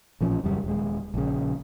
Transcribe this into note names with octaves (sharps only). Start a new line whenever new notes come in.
A1 A#2 F3 C#4
D#1 F#2 C#3 G3
D#1 G#3
A#1 C#3